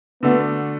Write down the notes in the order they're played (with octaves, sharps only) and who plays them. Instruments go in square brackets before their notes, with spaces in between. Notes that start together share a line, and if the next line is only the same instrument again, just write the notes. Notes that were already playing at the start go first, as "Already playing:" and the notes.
[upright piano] D3 A3 D4 F#4 [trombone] B3